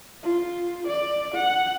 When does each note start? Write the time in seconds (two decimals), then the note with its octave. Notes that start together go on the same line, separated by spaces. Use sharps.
0.23 F4
0.87 D5
1.35 F#5